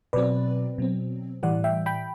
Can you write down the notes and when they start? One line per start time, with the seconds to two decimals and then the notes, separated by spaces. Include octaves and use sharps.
0.13 B2 F#3 C4 B4 D5
0.78 B2 F#3 C4
1.43 A2 E3 G3 D5 F#5
1.64 E5 G5
1.86 G5 B5